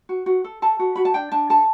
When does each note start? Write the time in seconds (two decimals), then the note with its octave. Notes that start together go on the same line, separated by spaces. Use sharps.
0.09 F#4
0.26 F#4
0.44 A4
0.62 A4 A5
0.79 F#4
0.95 F#4 B5
1.05 A5
1.14 D4 G5
1.32 D4 A5
1.50 A4 A5